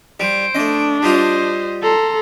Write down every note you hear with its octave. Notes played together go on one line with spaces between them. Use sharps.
G3 C5 D7
A3 D4 D#5
G3 F4 G4 C5 D#5
A4 A#5 C6